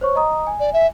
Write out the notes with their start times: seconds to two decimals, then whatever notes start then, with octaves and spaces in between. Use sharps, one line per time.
0.01 C5 C#5 C#6
0.15 D#5 A#5 D#6
0.47 G#5
0.60 D5
0.73 E5